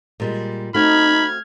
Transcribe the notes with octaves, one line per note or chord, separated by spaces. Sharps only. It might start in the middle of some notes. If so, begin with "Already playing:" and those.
A#2 G3 G#3
A3 C4 D#4 F#4 B5 F6 G#6